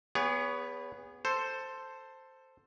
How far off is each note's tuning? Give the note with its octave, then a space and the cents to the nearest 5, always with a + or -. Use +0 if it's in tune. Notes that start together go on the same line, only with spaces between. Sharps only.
B3 +0 G#4 -30 C#5 +30
A4 +10 C5 +0